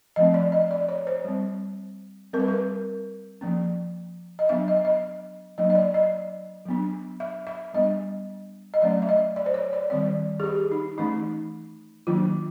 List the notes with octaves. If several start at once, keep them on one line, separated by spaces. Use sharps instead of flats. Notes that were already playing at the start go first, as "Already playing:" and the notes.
F3 A3 C4 D#5
D5
D#5
D5
C#5
C5
G3 C4
G3 C4 A#4
B4
A#4
F3 A#3 C#4
D#5
F#3 B3 D4 E5
D#5
D#5
F#3 A#3 D4 D#5
D#5
D5
D#5
F#3 B3 D4
E5
E5
G3 B3 D4 D#5
D#5
F#3 A3 C#4 D5
E5
D#5
D5
C5
C#5
D5
D#3 G3 C4 D5
G#4
G4
D#4
E3 A3 C#4 D#4
D#3 F#3 A#3 D4 F4